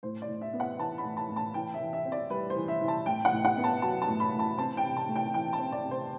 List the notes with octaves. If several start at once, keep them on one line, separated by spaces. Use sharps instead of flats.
A2 C5
D5
A2
E5
B3
F#5
E3 A5
B5
A2
A5
A2
A5
E3 G5
E5
E3
E5
C4
D5
G3 B4
C5
E3
E5
E3
A5
A2 G5
F#5
A2
F#5
B3
A5
F#3 A5
A5
A2
B5
A2
A5
C4 A5
G5
C3
A5
A3
G5
E3 G5
A5
C4
D5
C3
C5